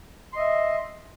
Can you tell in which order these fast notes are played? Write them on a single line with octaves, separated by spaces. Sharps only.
C6 D#5 E5